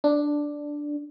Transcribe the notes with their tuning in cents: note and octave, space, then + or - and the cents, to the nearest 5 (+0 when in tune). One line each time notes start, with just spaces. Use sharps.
D4 +0